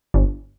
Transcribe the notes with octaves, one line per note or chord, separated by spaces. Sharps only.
G1